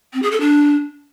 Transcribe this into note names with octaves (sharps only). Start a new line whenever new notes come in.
C4
G#4
A4
D4